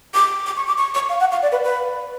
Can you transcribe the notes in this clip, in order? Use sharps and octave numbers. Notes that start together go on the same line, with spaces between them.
D6
D6
C#6
D6
C#6
C#6
F5
F#5
F5
D5
B4
B4